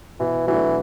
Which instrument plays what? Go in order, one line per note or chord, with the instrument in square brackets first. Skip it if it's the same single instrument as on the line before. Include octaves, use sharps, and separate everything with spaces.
[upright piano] B2 [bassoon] E3
[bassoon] E3 [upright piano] F#3 A3 D4